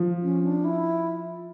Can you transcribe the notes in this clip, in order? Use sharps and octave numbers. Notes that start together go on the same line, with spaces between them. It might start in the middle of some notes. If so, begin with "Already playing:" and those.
Already playing: F3
C#4
D4
E4